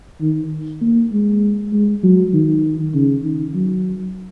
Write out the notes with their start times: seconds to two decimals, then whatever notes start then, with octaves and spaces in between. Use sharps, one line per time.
0.22 D#3
0.81 A#3
1.12 G#3
1.73 G#3
2.03 F#3
2.34 D#3
2.94 C#3
3.24 D#3
3.54 F#3